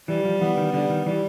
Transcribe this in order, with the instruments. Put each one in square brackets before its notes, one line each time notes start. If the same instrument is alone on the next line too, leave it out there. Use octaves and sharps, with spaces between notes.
[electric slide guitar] E3 [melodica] G3
[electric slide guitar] F3
[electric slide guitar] E3 [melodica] B3
[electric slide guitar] D#3
[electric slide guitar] D3 [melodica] G3
[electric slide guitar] D#3
[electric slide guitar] E3 [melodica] G3